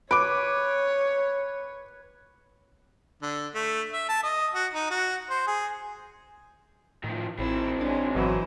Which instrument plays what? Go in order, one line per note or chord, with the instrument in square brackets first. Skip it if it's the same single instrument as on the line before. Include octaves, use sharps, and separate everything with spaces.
[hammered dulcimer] B4 [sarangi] C#5 [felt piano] D6 D7
[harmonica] D3
A3
E5
A5
D#5
F#4
D#4
F#4
C5
G#4
[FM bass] A2 [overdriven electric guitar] D#3 F3
[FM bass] A1 [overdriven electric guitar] D#3 C4 [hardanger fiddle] E4
[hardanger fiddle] G#3 C#5 [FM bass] D4
[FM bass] G#1 [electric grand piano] B2 E3 F#3 [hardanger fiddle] E4 C5